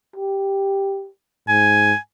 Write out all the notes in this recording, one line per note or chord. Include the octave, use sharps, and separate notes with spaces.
G4
G#2 G#5